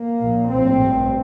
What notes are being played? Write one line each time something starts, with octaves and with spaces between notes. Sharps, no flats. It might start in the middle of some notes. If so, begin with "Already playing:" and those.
Already playing: A#3
A#1 A#2
A#1 A2 C4
A1 G2